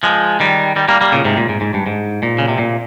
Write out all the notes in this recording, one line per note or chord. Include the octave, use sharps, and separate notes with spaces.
F3 G#3
D#3 G3
D#3 G3
G3 A#3
G3 A#3
A#2 C#3
G#2 C3
A#2
G#2
G#2
G2
G#2
A#2
C#3
C3
A#2